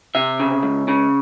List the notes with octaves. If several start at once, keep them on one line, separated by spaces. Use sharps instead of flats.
C3 E5
C#3
C#2
C#3